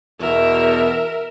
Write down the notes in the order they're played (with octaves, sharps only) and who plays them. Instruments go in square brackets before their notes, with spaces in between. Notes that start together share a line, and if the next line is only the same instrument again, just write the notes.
[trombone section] E2 B2 [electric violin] A#4 E5